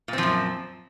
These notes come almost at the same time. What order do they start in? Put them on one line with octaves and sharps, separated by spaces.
A#2 C4 F3 F#2